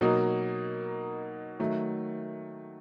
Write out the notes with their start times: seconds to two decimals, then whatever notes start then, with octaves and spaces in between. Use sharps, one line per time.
0.01 B2 F#3 A#3 D#4
1.59 D#3 F#3 A3